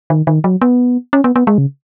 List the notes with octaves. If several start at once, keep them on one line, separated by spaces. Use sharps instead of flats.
D#3
D#3
F#3
B3
C#4
B3
B3
G#3
C#3